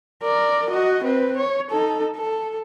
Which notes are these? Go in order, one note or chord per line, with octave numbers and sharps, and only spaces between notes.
A#4 D5
F#4 D#5
C4 B4
C#5
D#4 A4
A4